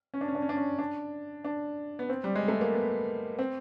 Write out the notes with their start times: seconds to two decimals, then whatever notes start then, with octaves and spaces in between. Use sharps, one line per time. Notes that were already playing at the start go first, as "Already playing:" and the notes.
0.14 C#4
0.21 D4
0.28 C#4
0.35 D4
0.42 C#4
0.49 D4
0.57 C#4
0.78 D4
1.44 D4
1.99 B3
2.09 C4
2.24 G3
2.36 G#3
2.48 A3
2.61 A#3
2.74 B3
3.39 C4